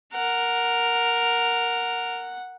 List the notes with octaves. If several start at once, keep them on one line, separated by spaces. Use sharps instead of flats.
A#4 F#5